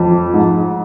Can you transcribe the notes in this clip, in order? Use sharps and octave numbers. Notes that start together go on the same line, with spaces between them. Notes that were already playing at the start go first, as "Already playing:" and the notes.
Already playing: F2
G#2